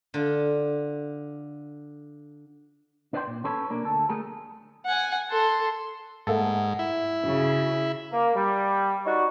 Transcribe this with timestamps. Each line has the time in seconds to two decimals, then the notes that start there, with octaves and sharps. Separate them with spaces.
0.14 D3 F4
3.13 D4 B4 D5 F#5 G5 C6
3.27 A#2
3.44 C#4 A4 B4 C#5
3.70 B2 A#3 D4 A#4
3.85 D2 A4
4.09 A3 G#4 A#4
4.85 F#5 G#5
5.30 A4 C6
6.27 G#2 A3 A#3 A4 F#5
6.79 E4
7.23 G2 C#3 F#4
8.12 A#3
8.35 G3
9.05 D#4 F#4 C#5 D5